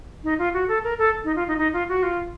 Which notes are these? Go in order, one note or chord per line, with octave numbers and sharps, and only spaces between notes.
D#4
F4
F#4
A4
A#4
A4
D#4
F4
D#4
D#4
F4
F#4
F4